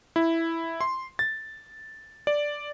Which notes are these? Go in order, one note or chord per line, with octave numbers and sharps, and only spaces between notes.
E4
C6
A6
D5